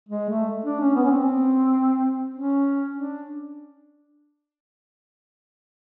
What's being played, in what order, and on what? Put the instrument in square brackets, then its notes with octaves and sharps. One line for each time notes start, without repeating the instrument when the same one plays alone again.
[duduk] G#3
A3
D4
C#4
B3
C#4
C4
C#4
D4